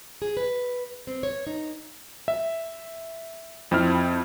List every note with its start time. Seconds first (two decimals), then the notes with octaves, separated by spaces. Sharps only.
0.22 G#4
0.37 B4
1.07 C4
1.23 C#5
1.47 D#4
2.28 E5
3.71 F2 C4 E4 F6